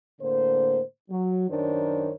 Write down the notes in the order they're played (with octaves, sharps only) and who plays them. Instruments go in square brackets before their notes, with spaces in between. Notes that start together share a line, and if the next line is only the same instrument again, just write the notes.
[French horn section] A2 D3 A#3 C5
F#3
F#2 D#3 D4 A#4 C5 C#5